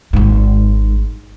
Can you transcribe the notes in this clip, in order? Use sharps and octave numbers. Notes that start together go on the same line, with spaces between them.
G#1 G#2